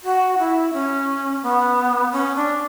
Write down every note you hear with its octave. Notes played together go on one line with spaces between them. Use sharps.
F#4
E4
C#4
B3
C#4
D4